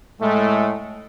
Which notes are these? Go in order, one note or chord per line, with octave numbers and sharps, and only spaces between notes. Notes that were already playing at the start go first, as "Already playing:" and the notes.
A2 G#3 A3